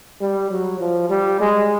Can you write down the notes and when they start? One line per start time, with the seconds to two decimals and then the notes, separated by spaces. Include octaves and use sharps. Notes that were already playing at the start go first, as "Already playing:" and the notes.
0.21 G3
0.51 F#3
0.80 F3
1.10 G3
1.40 G#3